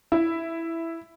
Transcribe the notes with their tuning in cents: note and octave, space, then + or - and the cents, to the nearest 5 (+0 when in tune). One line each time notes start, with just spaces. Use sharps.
E4 +0